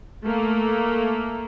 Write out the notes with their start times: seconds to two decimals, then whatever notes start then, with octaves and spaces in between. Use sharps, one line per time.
0.25 A3 A#3